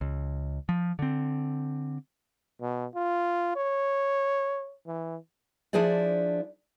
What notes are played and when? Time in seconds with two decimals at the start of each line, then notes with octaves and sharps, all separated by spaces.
0.01 C#2
0.69 F3
0.99 D3 C4
2.61 B2
2.94 F4
3.56 C#5
4.86 E3
5.73 F3 D4 E4 G#4 C5 D5